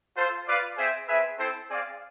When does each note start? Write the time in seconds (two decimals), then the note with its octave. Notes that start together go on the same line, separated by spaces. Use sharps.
0.15 F4 A4 C5
0.47 F4 B4 D5 F5
0.77 C4 G#4 C5 E5
1.08 C4 G#4 B4 E5
1.38 C4 E4 A4 C5
1.68 C4 G#4 D5 F5